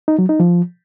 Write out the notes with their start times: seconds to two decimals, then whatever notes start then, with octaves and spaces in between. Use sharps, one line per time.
0.08 D#4
0.19 F#3
0.29 D#4
0.40 F3